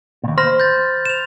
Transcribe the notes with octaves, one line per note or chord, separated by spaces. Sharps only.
D#2 A#2
C5 B5 F6 A#6
G6 A6
E7 F7